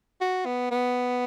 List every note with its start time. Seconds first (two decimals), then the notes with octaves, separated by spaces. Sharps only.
0.21 F#4
0.45 B3
0.71 B3